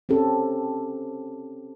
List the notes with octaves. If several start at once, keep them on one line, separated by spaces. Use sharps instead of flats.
C4 C#4 G4 A4